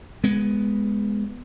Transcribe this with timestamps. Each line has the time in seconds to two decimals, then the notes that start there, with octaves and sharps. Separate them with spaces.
0.24 G#3 B3